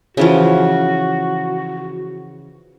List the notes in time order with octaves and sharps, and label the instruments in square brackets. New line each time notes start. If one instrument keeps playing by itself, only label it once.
[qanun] C#3 E3 F3 [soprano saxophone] F#4